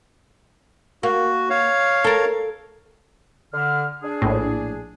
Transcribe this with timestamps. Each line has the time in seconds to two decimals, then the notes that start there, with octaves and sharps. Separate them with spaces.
1.03 A#3 F#4
1.50 C#5 F5
2.05 A4 A#4
3.53 D3 F6
4.02 D4 G#4
4.22 A#1 A2